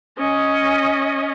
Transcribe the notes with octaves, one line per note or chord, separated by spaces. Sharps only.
C#4 D#5